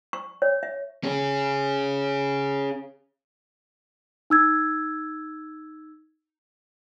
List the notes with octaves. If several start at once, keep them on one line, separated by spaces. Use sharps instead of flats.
C#6
C#5
E5
C#4 G#4
D#4 E6 G#6